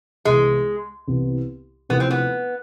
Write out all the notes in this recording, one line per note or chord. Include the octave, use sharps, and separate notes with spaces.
C2 C3 E3 G#3 B3
C2 C3 E3 B3
C3 F3 A3 B3 E4 A4
C4
B3